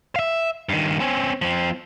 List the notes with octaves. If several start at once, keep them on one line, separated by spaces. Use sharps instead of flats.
E5 F5
G2 D#3
C4 C#4
F3 C4